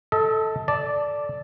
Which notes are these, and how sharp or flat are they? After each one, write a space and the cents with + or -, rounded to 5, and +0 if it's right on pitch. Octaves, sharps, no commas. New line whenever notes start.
A4 +0 D#5 +40
D5 -5 A5 +0